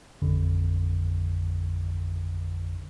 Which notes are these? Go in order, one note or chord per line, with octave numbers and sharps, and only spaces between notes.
A1 F2 D3